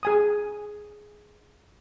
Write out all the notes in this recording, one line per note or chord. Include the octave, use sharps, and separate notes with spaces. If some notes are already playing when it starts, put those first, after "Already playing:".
G#4 G#5 D#6